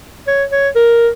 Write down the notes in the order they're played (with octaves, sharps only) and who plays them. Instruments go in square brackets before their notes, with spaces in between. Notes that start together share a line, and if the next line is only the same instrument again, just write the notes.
[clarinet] C#5
C#5
A#4